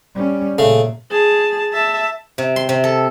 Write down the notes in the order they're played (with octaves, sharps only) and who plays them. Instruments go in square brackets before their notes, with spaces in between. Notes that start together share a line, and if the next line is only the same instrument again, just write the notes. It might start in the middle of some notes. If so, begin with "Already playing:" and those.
[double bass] G3 C#4
[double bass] A#2 [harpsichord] C#3 A3
[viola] G#4 A5
E5 A5
[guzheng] C3
C6
C3
A4